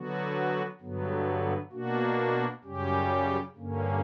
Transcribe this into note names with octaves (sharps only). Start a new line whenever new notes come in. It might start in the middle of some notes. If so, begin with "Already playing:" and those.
Already playing: D3 F#3 B3 F#4
G2 D3 F#3 B3
B2 A#3 D4 F#4
F#2 C#3 G3 C#4 G4
G2 D3 A#3 C#4